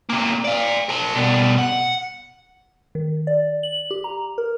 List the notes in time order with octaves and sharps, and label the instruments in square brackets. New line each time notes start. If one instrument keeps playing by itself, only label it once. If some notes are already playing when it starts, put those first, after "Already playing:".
[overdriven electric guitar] C3 A#3
D5 F5
A#4 A5
B2 G3
F#5
[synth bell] D#3
D5
F#7
G4
A#5
A#4